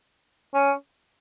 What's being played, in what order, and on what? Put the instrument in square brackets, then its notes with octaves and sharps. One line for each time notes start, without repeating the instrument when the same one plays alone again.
[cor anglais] C#4